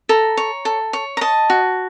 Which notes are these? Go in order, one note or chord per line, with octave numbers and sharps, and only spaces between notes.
A4 A#5
C#5
A4
C#5
A#5
D#5 A5
F#4